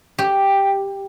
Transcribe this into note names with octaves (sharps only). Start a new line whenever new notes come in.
G4